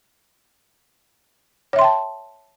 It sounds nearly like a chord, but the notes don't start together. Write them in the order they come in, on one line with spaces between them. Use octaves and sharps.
C#5 E5 C6 G5 A5